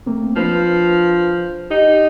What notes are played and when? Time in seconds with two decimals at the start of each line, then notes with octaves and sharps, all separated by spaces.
0.06 A3 A#3 C4
0.36 F3 D4 B4 C5
1.71 D#4 G4